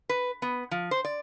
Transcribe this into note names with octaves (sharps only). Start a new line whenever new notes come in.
B4
B3
F3
C5
D5